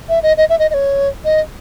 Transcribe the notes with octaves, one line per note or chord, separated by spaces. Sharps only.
E5
D#5
D#5
E5
D#5
D#5
C#5
D#5